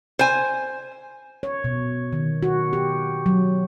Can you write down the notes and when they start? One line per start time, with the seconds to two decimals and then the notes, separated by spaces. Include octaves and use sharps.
0.19 C5 G#5
1.43 C#5
1.64 B2
2.13 D#3
2.43 F#4
2.73 G4
3.26 F#3